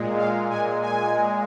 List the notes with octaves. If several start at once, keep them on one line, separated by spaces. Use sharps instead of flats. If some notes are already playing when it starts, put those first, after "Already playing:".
Already playing: A#2 G#3
F5
A#2 G#3 G#5
G#5
A#2 G#3